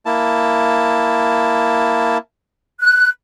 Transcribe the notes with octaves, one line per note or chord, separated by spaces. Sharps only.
A#3 E4 A5
F#6